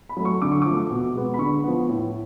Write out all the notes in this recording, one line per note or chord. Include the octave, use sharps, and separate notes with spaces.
B5
F#3 A3
C#6
D3 D6
C#6
F3 D6
A3
B2
G#3 B3
B5
D3 C#6
F3 B3
A2